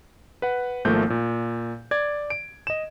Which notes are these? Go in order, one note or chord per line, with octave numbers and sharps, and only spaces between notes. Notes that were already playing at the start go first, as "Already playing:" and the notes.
B4 F#5
G#1 F3 A3 A#3 G6
A#2
D5 G#6
D7
D#5 E7